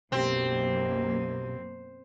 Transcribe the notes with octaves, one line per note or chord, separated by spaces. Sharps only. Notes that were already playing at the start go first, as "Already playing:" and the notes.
B1 F#2 B2 A#3 C4 G4